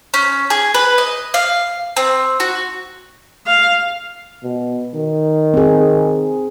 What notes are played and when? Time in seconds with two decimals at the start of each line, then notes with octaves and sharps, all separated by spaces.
0.14 C#4
0.50 G#4
0.74 B4
0.98 D#5
1.34 F5
1.97 C4
2.40 F#4
3.47 F5
4.43 B2
4.94 D#3
5.54 C4 G#4